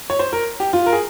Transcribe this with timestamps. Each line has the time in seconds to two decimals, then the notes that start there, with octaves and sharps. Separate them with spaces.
0.10 C#5
0.19 C5
0.33 A#4
0.60 G4
0.73 F4
0.86 A#4
0.93 G#4